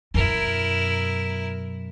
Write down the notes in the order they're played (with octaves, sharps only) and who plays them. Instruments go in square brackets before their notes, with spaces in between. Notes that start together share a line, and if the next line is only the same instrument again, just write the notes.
[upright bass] F#2 B2 [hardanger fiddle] E4 A#4